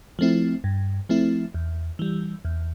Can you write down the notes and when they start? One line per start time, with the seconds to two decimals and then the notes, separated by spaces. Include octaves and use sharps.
0.19 F3 A3 C4 E4
0.64 G2
1.09 F3 A3 C4 E4
1.54 E2
1.99 E3 G3
2.45 E2